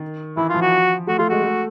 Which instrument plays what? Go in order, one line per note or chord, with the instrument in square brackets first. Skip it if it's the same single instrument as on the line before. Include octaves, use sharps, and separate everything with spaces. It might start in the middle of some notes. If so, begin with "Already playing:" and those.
Already playing: [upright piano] D#3
[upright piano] E3 [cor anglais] E4
[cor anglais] F4
[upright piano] F3
[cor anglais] F#4
[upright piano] A3 [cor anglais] F#4
[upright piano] A3 [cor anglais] F4
[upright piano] G#3 [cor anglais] F#4
[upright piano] A3